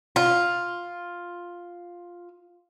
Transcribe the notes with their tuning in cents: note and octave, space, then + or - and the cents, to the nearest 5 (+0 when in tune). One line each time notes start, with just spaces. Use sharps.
F4 +5